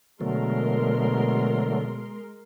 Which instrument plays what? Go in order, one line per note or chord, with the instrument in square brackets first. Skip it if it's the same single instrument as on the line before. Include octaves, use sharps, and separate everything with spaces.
[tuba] B2 [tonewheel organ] D3 F#3 A3 [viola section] G#3 A#4 C6